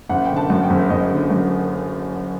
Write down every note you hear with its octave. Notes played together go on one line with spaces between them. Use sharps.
F#1 F#5
D3 G5
A5
F#2
G5
F#1
F#1 D#5
D3
F#2